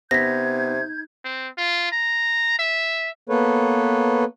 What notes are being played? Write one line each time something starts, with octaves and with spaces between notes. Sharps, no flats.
C3 B3 D#4 G6 G#6 A#6 B6
C4
F4
A#5
E5
A#3 B3 A4 B4 C#5